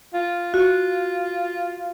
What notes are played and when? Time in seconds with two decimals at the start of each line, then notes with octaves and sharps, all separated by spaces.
0.13 F4
0.54 F4 F#4